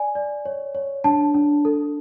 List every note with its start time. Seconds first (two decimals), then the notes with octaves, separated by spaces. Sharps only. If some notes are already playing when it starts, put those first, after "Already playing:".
Already playing: D5 G#5
0.15 D5
0.45 C#5
0.75 C#5
1.04 D4 A5
1.34 D4
1.65 A4